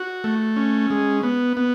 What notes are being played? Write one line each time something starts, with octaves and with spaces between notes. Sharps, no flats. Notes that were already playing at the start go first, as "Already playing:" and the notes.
Already playing: F#4
A3
C#4
G#3
B3
B3